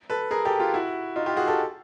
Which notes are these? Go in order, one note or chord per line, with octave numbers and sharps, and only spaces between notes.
A4 B4
G#4 A#4
G4 A4
F4 G4
E4 F#4
D#4 F4
F4 G4
F#4 G#4
G4 A4